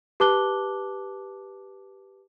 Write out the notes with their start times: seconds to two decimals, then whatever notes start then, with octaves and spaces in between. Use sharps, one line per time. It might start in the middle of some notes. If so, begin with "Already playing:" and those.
0.20 G4 B4 A5 D6 F#6 G7